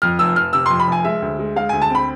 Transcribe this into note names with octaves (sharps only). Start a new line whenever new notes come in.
F2 F6
F1 E6
F1 F6
C3 E6
F2 C6
B5
F1 G#5
G#3 E5
D2
G#3
G#3 F5
D2 G#5
A5
C4 B5